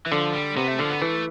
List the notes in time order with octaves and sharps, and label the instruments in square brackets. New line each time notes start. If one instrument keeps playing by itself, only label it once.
[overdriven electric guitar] E3
[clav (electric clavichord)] D3 [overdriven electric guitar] F3
[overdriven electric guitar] G3
[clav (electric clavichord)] C3 [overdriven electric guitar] B3
[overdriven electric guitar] A3
[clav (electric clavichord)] D3 [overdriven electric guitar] F3
[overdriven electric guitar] B3
[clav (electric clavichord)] E3 [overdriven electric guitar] A3